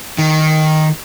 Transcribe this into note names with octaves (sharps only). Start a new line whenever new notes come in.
D#3